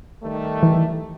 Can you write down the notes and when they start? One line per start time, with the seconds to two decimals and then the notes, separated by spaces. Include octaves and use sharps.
0.24 D#3 G3 A3
0.63 E3